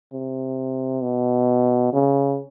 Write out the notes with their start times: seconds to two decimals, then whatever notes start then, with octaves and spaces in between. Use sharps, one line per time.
0.13 C3
1.03 B2
1.93 C#3